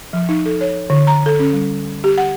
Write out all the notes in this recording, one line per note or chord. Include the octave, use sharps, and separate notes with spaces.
F3
D#4
A4
C#5
D3
A#5
A4
C#4
G3
G4
F#5